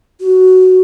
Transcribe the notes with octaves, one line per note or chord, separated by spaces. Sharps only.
F#4